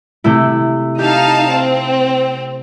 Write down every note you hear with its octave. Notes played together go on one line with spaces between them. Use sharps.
C3 A3 E4
D#4 G4 F5 A5
C4